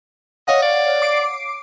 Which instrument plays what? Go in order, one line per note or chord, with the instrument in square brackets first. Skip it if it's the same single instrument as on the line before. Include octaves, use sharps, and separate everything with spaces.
[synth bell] C#5 F5 F#5 [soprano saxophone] D#5
[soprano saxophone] D5
[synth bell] D6 C7 D7